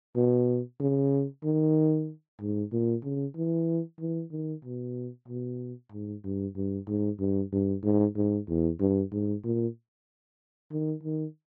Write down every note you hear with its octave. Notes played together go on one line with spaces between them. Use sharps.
B2
C#3
D#3
G#2
A#2
C#3
E3
E3
D#3
B2
B2
G#2
G2
G2
G#2
G2
G2
G#2
G#2
E2
G2
G#2
A#2
D#3
D#3